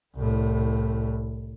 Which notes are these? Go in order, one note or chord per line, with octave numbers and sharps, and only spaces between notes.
C2 A2